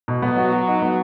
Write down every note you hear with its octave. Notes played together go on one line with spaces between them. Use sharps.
B2
F#3 B3
F#4
F#4
D#4
B3